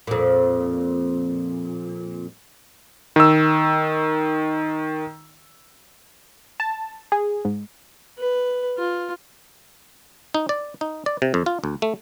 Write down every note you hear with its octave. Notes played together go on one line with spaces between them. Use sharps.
F2 A#2
D#3 E6
A5
G#4
G#2
B4
F4
D#4
D5
D#4
D5
C3
F2
F4
D2
A3